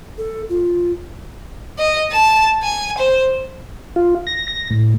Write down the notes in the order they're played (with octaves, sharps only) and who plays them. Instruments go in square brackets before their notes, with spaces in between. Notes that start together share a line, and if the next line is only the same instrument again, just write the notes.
[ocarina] A4
F4
[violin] D#5
A5
G#5
C5
[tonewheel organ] F4
A#6
A#6
A2